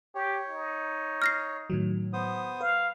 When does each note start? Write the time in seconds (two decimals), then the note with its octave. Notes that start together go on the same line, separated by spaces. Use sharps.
0.15 G4 C#5
0.49 D#4
1.22 F6 A#6 C7
1.70 A2 D#3 F#3
2.13 B3 C5 D#6
2.61 B4 F5